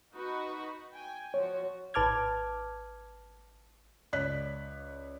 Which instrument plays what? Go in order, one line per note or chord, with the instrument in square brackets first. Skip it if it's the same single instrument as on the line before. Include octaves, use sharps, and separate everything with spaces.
[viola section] D#4 F#4 B4
G5 G#5
[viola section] F3 F#4 [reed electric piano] C#5
[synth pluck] G#1 B4 A5 D6 F6 G#6
[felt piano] C#2 C#5 D5 F#6 B6